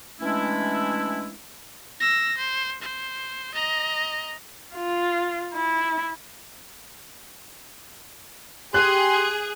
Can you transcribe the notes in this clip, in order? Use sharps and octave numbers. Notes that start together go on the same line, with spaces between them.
E3 G#3 A3 C#4 D4 E4
E6 A#6
C5
C5
D#5 A#5
F4
E4
G4 G#4 C6 F#6